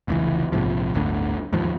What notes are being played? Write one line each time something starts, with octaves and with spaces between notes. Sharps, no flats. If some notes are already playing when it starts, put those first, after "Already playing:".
F1 C#2 E3
A#1 G#2 C3 F3
D1 G1 D2 D3
D#2 G#2 F3